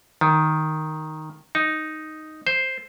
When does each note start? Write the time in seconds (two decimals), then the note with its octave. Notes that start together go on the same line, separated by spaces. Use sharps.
0.21 D#3
1.55 D#4
2.47 C5